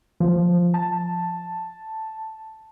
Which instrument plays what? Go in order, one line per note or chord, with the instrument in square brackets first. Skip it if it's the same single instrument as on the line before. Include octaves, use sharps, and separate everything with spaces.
[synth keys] F3
A5